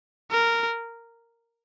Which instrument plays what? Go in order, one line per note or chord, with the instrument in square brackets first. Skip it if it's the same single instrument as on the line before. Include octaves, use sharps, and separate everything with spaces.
[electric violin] A#4